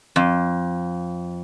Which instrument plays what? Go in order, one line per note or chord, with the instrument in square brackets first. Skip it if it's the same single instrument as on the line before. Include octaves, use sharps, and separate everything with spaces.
[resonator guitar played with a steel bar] F2